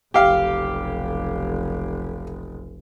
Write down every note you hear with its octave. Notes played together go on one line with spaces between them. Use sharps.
F1 B1 G4 F5